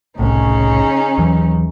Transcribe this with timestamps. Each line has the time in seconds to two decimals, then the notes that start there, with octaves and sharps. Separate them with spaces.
0.19 F1 C2 A2 C#3 C#4 D#4
1.18 D#2 E3 F#3